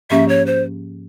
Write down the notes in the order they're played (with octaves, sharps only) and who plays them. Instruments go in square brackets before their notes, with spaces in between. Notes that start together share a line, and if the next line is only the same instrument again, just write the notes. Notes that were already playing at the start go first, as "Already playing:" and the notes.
[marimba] G#2 F3 A#3 C#4 G4 [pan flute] E5
[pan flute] C#5
C5